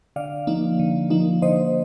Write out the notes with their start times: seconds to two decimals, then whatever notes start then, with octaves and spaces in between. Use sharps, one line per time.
0.16 D3 D5 F5
0.47 F3 A#3 D#4
0.79 D3
1.10 F3 A#3 D#4
1.42 D3 C5 D#5